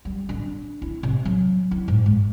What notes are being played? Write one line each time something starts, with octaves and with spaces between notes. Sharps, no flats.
G3
D3
E4
C3
F#3
E4
G#2
G#3